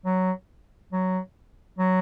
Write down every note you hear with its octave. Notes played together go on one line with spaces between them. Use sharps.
F#3
F#3
F#3